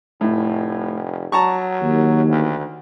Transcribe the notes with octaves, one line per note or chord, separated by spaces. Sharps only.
F1 A2
F#3 A5 A#5 C#6
D#2
D2